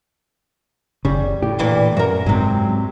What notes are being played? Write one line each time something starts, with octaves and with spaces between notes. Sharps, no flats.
F#1 C#3 G3
A2 G4
A#2 E3 D4
F#2 F#4 A#4
G#2 C3 F#3 G#3 C4